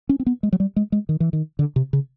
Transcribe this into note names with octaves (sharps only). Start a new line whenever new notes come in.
C#4
C4
B3
G#3
F#3
G3
G#3
G#3
D#3
E3
D#3
D3
C3
C#3